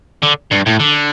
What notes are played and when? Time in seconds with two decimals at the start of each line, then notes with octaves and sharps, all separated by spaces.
0.23 D3
0.51 G2
0.66 A2
0.80 D3